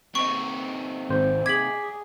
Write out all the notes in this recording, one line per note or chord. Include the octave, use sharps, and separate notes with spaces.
C3 D#4 C#6
G#1 C5
G#4 D6 G#6 B6 F#7